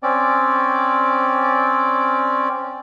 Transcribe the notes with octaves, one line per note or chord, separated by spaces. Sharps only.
C4 C#4 D5